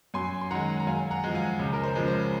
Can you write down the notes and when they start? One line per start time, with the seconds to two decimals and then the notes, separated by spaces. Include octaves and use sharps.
0.14 F#2 G#5 C6
0.41 C6
0.51 D#3 G#3 F#5 A#5
0.80 A#5
0.87 F#2 F5 G#5
1.11 F#5 A#5
1.24 F3 G#3
1.35 F5 G#5
1.59 C#2
1.73 A#4
1.83 C5
1.95 C#3 F3 G#3
2.08 C5